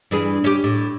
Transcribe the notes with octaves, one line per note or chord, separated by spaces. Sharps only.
G2 E3 G#4
C#4 G4
A2